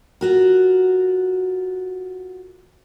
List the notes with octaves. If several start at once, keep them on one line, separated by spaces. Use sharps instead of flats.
F4 F#4 A#4